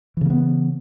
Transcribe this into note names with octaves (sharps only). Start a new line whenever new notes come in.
C#3 E3 A#3 B3